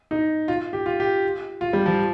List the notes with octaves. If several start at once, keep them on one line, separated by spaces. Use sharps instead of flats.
D#4
F4
G4
F4
G4
F4
G3
F3